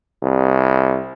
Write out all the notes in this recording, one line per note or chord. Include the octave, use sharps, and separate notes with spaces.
C2